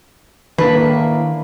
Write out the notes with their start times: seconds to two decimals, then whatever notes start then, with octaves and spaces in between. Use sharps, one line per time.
0.58 A2 D#3 A#3 D4 B4